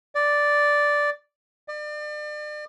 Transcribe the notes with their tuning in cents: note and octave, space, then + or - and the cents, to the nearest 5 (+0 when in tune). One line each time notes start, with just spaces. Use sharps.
D5 -5
D5 +35